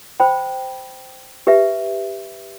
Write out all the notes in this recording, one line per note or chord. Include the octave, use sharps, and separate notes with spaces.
C5 G5 B5
G4 B4 E5